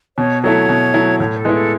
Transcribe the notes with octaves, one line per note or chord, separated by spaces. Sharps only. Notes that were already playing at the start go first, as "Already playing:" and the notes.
B2 C#5
F#3 A3 E4 C#5
B2
F#3 A3 E4
A2 C#5
A4
G#3 B3 E4
A4